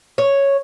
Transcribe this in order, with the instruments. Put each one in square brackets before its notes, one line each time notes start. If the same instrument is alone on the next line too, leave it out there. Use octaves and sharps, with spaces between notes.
[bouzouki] C#5